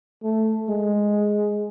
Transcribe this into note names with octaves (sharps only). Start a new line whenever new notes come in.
A3
G#3